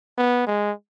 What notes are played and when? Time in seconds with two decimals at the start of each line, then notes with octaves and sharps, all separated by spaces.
0.18 B3
0.47 G#3